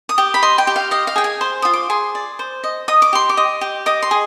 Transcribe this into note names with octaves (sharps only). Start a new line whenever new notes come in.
D#6
G4
B5
D#5 C6
G5
G4
F5
D#5 F5
F5
G#4 G5
G#5
C5 C6
F4 D#6
D6
G#4 C6
D5
C5
D#5
D#5 D#6
D6
G4 C6
D6
D#5
G4
D#5 D6
C6
G#4